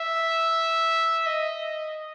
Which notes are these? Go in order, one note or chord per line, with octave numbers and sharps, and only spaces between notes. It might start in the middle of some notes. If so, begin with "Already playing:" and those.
Already playing: E5
D#5